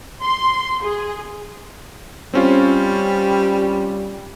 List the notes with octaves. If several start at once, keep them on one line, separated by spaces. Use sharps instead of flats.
C6
G#4
G3 C4 C#4 F4